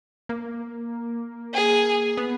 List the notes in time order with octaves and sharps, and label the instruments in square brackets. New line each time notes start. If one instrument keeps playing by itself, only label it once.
[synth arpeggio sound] A#3
[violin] G#4
[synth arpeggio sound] B3